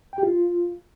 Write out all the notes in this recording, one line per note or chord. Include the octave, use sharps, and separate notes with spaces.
G5
G4
F4